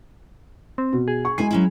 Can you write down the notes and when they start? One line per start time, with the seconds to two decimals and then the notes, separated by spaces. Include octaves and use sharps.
0.78 C4
0.93 B2
1.08 G#4
1.25 C#6
1.38 G#3 E4 G#5 C7
1.51 F#3 C#4 E4